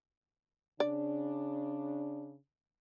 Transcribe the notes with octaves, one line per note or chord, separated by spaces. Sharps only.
C#3 D4 D5